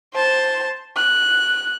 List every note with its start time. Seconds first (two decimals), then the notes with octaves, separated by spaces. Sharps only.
0.13 C5 A5
0.96 F#6